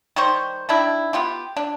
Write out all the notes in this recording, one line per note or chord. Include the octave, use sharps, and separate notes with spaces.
D#3 G3 C5 C#6
D#3 D4 E4
B3 F4 G4
D4